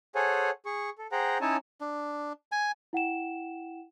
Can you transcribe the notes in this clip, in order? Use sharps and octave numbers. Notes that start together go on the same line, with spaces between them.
G#4 A4 C5 C#5 F#5 G#5
G#4 C#6
A4
G#4 C5 F#5 G5 A#5
C#4 D#4 E4 C#5 G#5 A5
D4
G#5
E4 F#5 G5 E7